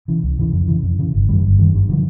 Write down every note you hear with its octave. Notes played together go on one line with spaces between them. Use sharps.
C#3 E3
C#2
C#3 E3
F2
C#3 E3
F2
C#3 E3
G1
F#2 D#3 G3
G1
F#2 D#3 G3
G2
D3 F3